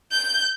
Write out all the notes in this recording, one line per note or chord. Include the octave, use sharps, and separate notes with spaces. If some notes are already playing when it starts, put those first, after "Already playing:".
G6